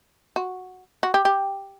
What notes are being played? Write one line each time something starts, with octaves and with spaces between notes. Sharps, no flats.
F#4
F#4
G4
G4